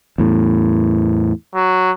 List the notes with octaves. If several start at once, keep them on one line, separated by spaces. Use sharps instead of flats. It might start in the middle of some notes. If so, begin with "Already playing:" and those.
E2 A2
F#3